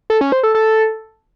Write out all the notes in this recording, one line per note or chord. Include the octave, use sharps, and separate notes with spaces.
A4
C#4
C5
A4
A4